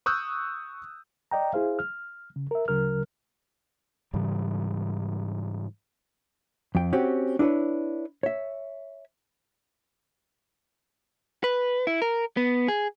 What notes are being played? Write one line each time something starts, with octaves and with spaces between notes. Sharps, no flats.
C#6 D#6 E6 F#6 G6
D5 D#5 G5 A#5
E4 G#4 C5 F5
F6
C#3
A#4 E5
D2 C#3 F#3 A#4 F6
G#2 C#3 E3 G3
F2 G5
C4 C#4 F#4 G4
D4 E4 G#4 B4 C#5
C#5 E5
B4
E4
A#4
B3
G#4